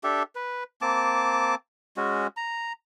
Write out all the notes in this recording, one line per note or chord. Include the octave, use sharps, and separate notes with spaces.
D4 G4 A4 E5
B4
A#3 C4 A5 D6
G#3 C#4 F#4
A#5